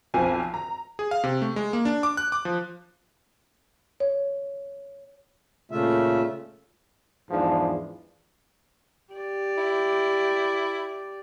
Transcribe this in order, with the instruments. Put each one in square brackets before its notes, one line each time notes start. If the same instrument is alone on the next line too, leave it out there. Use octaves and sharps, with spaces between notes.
[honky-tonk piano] B1 F2 C4 F4 G#5
A#5
[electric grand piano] G#4
F5
C3
A3
G#3
A#3
D4
D6
F#6
D6
F3
[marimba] C#5
[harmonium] A#2 C#3 A3 F4 E5
[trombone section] E2 G#2 E3 F3 G#3 D4
[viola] G4 D5
[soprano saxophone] E4